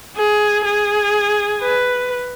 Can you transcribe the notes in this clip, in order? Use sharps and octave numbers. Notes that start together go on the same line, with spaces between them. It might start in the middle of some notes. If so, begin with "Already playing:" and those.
G#4
G#4
B4